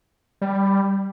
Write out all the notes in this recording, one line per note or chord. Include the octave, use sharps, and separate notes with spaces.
G3